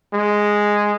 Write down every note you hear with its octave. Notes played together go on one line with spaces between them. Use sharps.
G#3